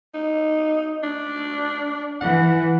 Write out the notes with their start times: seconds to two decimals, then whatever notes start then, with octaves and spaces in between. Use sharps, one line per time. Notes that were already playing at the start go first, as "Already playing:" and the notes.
0.14 D#4
1.03 D4
2.21 E3 F#5